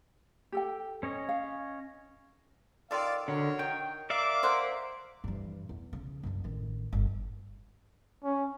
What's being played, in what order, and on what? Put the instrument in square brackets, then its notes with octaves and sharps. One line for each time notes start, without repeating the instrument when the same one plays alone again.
[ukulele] G4 A4 G5
[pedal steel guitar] C#4 C#5 D#5
[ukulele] F5
[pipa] D#3 F4 A4 [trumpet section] D5 F5
[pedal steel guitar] D3 [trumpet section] F#4 A#4 C#5
[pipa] D#3 [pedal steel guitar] G5
[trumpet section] A#4 D6 [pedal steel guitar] D5 E5 F5
[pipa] A#3 C5 F#5
[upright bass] G2 E3
E2
C#3
F#1 D4
A1 D#3
G1
[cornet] C#4